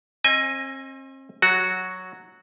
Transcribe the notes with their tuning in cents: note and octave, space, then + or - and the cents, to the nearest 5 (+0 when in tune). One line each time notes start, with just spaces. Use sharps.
C4 +40 D#5 +0 G#5 -10
F#3 +0 F#4 -5